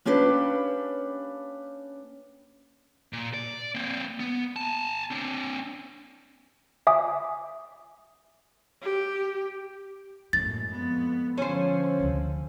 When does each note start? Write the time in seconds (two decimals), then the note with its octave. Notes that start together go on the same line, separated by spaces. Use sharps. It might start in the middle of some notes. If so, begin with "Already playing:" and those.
0.05 A#3 C#4 D4 G4 B4
3.13 A#2
3.34 D5
3.75 A#3 C4
4.20 B3
4.56 G#5 A5
5.11 C4 D4
6.87 E5 G#5 D6 D#6
8.82 G4
10.33 F#2 A2 G#3 A#3 A6
10.71 F2 B3
11.38 D3 F3 C#4 C5
12.00 D2 C#3